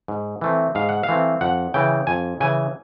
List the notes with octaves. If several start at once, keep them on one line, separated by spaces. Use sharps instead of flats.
G#2
E3 A3 C4
G#2 F5
F#5
F5
E3 A3 C4
F2 F#5
C#3 E3 G5
F2 G#5
C#3 E3 G#5